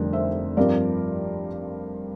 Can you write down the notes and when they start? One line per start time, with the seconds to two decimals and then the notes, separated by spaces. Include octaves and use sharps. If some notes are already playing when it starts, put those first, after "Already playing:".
Already playing: F1 F2 D3 G3 D4 A#4
0.13 C5 E5
0.57 G2 F3 C4 A#4 D5